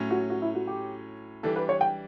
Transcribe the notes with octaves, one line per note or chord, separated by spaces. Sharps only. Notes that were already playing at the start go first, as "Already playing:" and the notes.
Already playing: A2 F#3 C#4
F#4
F#4
E4
F#4
G4
E3 G3 D4 A4
B4
C#5
G5